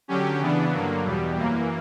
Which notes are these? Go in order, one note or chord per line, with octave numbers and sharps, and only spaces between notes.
D3 F#3 C#4 G4
C#3 E3 B3 D4
G2 D3 F#3 A#3
E2 B2 G3
F#2 E3 A#3